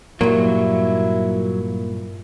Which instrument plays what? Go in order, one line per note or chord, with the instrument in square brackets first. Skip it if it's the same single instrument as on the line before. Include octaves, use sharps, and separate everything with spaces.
[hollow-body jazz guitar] G2 A#2 [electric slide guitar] F#3 [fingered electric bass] A#3 [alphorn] E4